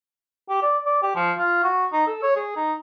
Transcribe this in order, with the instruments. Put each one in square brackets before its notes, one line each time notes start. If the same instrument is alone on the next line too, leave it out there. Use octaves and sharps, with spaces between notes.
[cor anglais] G4
D5
D5
G4
F3
F4
F#4
D#4
A4
C#5
G#4
D#4